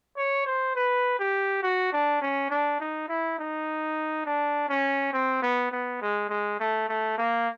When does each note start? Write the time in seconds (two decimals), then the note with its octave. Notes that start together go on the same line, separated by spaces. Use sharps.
0.17 C#5
0.46 C5
0.75 B4
1.19 G4
1.63 F#4
1.93 D4
2.21 C#4
2.50 D4
2.80 D#4
3.08 E4
3.38 D#4
4.26 D4
4.69 C#4
5.13 C4
5.42 B3
5.71 B3
6.01 G#3
6.29 G#3
6.60 A3
6.89 A3
7.18 A#3